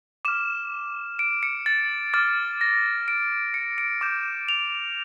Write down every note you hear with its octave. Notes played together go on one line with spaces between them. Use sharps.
D6 F6 E7
D7
C#7
A6
D6 F6 A6
A#6
D7
C#7
D7
D6 G6 E7
F7